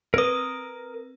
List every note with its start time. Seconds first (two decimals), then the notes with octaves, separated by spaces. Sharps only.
0.14 C4 A#4 B4 D#6